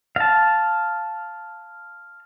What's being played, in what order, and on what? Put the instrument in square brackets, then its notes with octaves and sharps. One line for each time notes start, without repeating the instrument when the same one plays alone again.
[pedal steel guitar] F5 A5